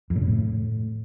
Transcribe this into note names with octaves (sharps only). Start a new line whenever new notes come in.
F2
A2
C#3
A2